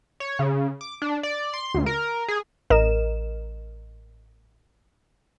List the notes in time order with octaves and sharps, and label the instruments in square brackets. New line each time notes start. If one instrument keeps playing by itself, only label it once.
[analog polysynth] C#5
C#3
D6
D4
D5
C6
D2
A#4
G#4
[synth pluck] A1 A#4 D#5 E7